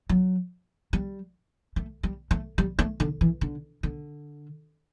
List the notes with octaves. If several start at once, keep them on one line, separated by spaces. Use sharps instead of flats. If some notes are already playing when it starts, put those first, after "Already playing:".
F#3
G3
A3
G3
A3
G3
A3
D3
E3
D3
D3